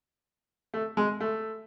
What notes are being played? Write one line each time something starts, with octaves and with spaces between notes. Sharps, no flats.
A3
G#3
A3